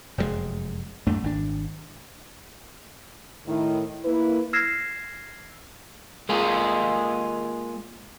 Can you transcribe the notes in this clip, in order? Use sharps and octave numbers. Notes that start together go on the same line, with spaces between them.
F1 F#2 C3 G#3
A1 F#2 A3 D4
G#1 D4
A2 D#3 E4
A#3 E4 B4
E6 F6 G#6 A#6 C7 E7
G#3 A#3 F4 G#4